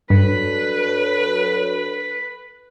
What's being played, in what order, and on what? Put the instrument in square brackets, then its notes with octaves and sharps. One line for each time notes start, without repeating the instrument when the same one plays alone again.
[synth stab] G2 [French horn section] F#3 D4 A4 [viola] B4 [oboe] B5